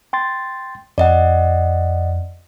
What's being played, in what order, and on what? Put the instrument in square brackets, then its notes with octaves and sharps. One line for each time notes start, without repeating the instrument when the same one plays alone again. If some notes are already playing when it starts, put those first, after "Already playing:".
[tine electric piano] G5 C6 A6
[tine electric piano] F2 [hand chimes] D5 D#5 F#5